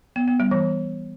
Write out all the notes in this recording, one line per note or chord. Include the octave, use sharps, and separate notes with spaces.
B3
B3
G3
E3